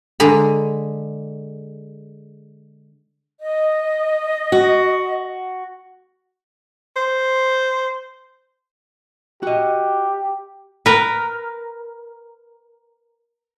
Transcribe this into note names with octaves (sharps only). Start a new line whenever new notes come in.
D3 G#3 G#4 A#5 B5
D#5
F#4
C5
F#4 G4 D#5
A#4 B4